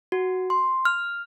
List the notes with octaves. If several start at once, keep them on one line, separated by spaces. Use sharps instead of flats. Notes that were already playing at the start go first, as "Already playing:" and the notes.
F#4
C6
F6